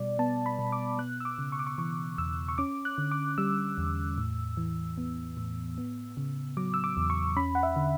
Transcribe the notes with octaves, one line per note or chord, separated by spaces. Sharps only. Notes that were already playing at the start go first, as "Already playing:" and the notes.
Already playing: B2 G3 D5
B3 A5
B5
B2
D6
B3 F#6
E6
D6
C#3
C#6
D6
C#6
E3 C#6
E2 E6
C#6
C#4 D6
F#6
D3
D6
G3 E6
E2
A2
E3
B3
A2
B3
C#3
F#3 D6
E6
D6
E2
C#6
C#4 B5
F#5
E5
D3